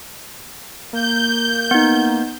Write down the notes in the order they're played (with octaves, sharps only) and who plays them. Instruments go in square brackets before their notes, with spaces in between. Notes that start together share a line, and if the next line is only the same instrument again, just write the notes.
[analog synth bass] A#3 [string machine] G6
[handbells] B3 D#4